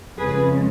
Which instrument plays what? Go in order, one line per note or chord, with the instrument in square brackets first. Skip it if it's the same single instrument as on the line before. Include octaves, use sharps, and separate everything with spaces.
[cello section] F2 C#3 G#3 G#4 B4